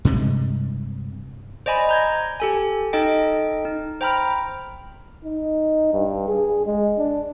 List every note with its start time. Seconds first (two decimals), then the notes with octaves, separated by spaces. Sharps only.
0.05 G2 C3 G#3
1.66 C5 D5 D#5 G#5 B5
1.89 A#5 G6 G#6
2.40 G4 A4 G#5
2.93 D#4 A4 D#5 G5
3.65 D#4
4.01 C5 G5 A#5 B5 F6
5.25 D#4
5.93 G2
6.28 G#4
6.66 G#3
6.98 D4